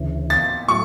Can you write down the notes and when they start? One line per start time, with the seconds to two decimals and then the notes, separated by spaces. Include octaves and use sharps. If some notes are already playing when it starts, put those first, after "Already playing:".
Already playing: D2 C#3 E3
0.30 A6
0.68 A2 F#3 A3 E4 C#6